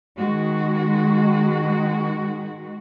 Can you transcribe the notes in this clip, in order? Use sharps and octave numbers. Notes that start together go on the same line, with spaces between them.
D#3 G#3 F#4